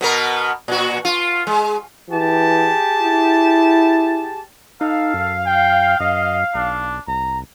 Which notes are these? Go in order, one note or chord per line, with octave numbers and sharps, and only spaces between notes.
B2 B3 A#4
A#2 F#4
F4
G#3
E3 G4 G#4 A5
E4
D#4 A4 F5
F#2
G5
F#2 D#5
B1 D4
C2 A#5